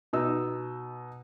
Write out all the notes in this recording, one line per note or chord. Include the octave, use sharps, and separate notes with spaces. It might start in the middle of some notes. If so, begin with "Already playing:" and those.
B2 D#4 E6